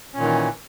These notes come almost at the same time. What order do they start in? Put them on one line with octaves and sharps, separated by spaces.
C#4 A#2 D#3 E3